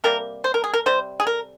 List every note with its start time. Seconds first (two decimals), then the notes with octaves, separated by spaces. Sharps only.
0.04 C3 G3 A#3 A#4
0.44 C5
0.54 A#4
0.64 G#4
0.74 A#4
0.86 C3 G3 C5
1.20 G#4
1.27 A#4